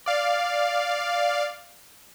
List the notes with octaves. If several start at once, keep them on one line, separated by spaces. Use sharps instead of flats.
D5 F5